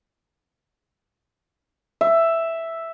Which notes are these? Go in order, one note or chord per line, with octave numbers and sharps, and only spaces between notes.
E5